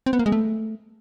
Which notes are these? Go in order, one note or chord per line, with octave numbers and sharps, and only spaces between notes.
C4
B3
A#3
G#3
A3